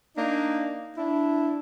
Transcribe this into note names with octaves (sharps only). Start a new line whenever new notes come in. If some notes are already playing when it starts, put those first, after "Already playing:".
A#3 D4 D#4
D4 E4